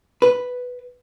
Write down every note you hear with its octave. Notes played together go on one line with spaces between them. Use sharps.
B4